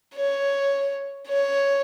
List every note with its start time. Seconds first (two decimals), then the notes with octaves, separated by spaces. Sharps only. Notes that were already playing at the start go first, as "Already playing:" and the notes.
0.16 C#5
1.28 C#5